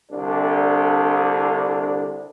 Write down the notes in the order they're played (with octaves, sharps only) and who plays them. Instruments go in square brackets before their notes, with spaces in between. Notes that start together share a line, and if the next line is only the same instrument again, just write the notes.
[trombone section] C2 D3 D4